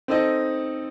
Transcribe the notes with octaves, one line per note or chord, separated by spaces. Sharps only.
C4 D#4 A4 D#5